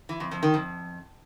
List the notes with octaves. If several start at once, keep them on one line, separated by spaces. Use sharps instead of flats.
E3
F2
F2
D#3
F2